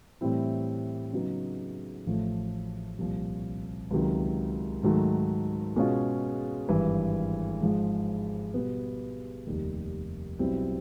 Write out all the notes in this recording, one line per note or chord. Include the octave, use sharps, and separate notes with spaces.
A2 E3 G3 C4 E4
C#3 F#3 B3 D#4
A1 A2 F3 A3
C2 A#2 F3
C#2 C3 D#3 F#3
G#2 D#3 F#3 A3
B2 G#3 C#4 F4
G#1 G2 E3
G#2 F3 G#3
B2 G3 B3
F1 D#2 D#3 G3
B1 B2 G3 C4 E4